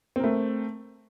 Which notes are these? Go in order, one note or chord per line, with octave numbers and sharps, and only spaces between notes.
A3 C4 A#4